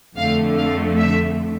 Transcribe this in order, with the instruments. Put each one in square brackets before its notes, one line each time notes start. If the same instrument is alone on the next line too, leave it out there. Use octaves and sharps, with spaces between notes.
[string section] F2 D3 A3 F5
F5
E5